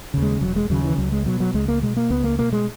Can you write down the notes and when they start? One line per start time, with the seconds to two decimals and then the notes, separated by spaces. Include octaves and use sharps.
0.14 D#2 C#3
0.22 G#3
0.41 E1 F#3
0.56 G#3
0.69 D#2 C#3 F#3
0.84 E3
0.98 C#2 F#3
1.12 G#3
1.26 B2 F#3
1.40 F#3
1.54 C#2 G#3
1.68 A#3
1.82 B2 G#3
1.97 A#3
2.10 C#2 B3
2.24 A#3
2.38 B2 A#3
2.53 G#3